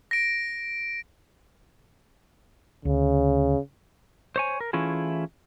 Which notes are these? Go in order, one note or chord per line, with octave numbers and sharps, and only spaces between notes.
A#6 D7
D2 C#3
C5 C#5 G#5
A#4
E3 A3 C#4 E4 F4 G#4